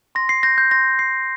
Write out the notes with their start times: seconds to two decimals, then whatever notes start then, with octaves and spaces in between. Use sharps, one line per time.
0.15 C6 A#6
0.29 C7
0.43 G6 A#6
0.58 G6
0.71 C6 A#6
0.99 G6 C7